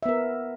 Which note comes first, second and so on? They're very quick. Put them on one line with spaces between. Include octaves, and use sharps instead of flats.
E5 B3 A#4